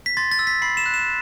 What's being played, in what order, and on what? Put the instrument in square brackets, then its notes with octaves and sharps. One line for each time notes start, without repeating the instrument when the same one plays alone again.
[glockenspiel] B6
C6 A6
A6
E6
B6
B5 C7
E7
F#6
E7